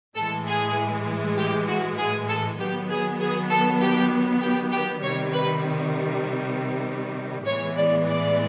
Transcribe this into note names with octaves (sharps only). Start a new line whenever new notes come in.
A2 E3 G#3 A4
G#4
G4
F#4
G#4
A4
D#3 F#3 B3 G4
G#4
G#4
A4
G4
G4
G4
C3 D#3 G3 C#5
B4
A2 E3 G#3 B3 C#5
D5
D5